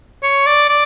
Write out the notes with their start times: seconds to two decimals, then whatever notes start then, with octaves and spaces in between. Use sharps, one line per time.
0.23 C#5
0.46 D5
0.69 D5